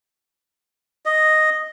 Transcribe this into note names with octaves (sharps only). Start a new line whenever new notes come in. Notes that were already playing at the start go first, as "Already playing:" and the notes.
D#5